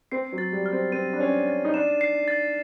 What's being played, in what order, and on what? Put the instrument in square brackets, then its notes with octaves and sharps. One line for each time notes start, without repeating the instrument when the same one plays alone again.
[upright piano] C4 [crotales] C7
[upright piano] F#3
[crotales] A6
[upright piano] G3
[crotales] F6
[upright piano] C4
[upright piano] C4 [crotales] D#7
[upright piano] D4
[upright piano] C#4 [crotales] C7
[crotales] A6
[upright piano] D#4
[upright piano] D4 [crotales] E7
[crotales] C7
A6